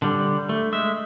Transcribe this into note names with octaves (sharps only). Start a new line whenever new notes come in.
D3 G3
A3
G#3 E5